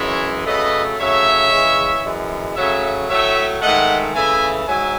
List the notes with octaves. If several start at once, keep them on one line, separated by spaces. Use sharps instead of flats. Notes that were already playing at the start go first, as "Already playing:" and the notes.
Already playing: F#2 C#3 E3 G#3 C#5 E5
C#3 F#3 A3 B4 D#5
C#3 F#3 A3 C#5 E5
C#3 E3 G#3
F#2 E3 G#3
C#3 F#3 A3 C#5 E5
A2 F#3 A3 C#5 E5
G#2 D#3 A3 D#5 F#5
C#3 E3 A3 E5 G#5
G#2 F#3 E5 G#5